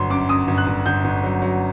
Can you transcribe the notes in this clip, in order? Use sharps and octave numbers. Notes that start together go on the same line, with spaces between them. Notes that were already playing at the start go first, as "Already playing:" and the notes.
Already playing: G1 F#3 C6
F#2 D6
F#2 D#6
G1
F#6
G1
G1 G6
G1
F#3
F#3